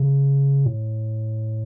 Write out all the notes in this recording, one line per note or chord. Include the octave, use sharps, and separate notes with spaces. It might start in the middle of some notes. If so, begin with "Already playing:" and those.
Already playing: C#3
A2